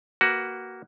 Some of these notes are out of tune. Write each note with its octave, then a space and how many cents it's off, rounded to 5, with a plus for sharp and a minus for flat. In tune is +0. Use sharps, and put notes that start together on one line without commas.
A#3 +0 F#4 +15 B4 +0